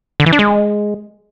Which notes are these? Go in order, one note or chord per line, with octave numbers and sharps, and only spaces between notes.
D3
E3
D4
G#3